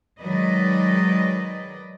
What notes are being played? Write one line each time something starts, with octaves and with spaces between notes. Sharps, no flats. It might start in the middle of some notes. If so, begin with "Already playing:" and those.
D#3 F#3 G#3 B4 D5 D#5